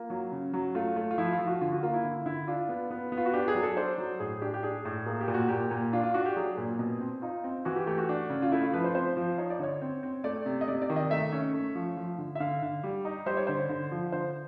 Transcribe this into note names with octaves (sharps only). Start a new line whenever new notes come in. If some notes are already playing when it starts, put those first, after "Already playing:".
Already playing: A#3 F4
F#3
C#3
F#3
A3 F4
A3
F4
F3 E4
F4
F3
F#4
D3 F4
F#4
A#3 F4
E4
D3 F4
D3 E4
D4 F4
B3
B3
B3
F4
F#4
D4 G4
G#4
F#3
A4
D4 C5
F#3
A2 G#4
D4 G4
G4
D4 G#4
A2
A#3 G#4
G4
A#2
F#4
A#2 G4
A#2
D4 F4
F4
D4 F#4
G4
F#3 G#4
A#2
B2
C4
D#4 F4
C4
E3 F#4
G4
A3 G4
F#4
D4
C#3
F4
A3 E4
F4
F3 B4
C5
C4 C5
F3
D#4 C#5
D5
D3 C#5
C4
C4
A3 D5
C3
D#5
C3 D5
D5
D#3
D#5
A3 E5
C#4
A3
F3
F3
D3
E5
D3 F5
D3
G3
D#4
G3 C5
C#5
D3 C5
D3
F3
D3 C5